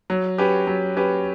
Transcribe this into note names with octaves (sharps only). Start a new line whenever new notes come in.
F#3
C#4 G4 B4
F#3
C#4 G4 B4